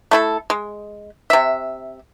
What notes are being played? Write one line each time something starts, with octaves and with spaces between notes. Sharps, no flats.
A3 E4 A4
G#3
C3 E5